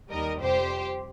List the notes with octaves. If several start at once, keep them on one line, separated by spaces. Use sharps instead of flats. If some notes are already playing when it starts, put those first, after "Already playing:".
D#2 D#3 G3 A#4 D#5
F2 C3 G3 G4 C5